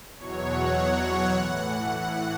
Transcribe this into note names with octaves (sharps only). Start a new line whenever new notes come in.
E2 B2 F#3 C#5
F#5
A2 E3
F#5